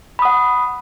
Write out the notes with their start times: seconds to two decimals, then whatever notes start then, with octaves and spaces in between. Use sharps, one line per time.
0.19 B5
0.22 D#6
0.25 F#5